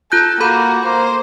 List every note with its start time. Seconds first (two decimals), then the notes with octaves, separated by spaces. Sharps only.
0.12 F4 A4 F#6 G6
0.40 A#3 F#4 A4 B5 G6
0.85 A#3 C5